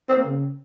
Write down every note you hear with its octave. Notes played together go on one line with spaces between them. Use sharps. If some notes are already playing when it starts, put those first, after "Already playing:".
C4
A#3
C#3